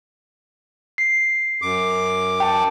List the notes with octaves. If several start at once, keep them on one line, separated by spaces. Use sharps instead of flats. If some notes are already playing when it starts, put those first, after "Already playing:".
C7
F#2 D6
G5 A5